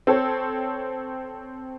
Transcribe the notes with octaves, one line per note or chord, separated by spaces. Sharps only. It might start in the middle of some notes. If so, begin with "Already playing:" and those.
C4 A4 C#5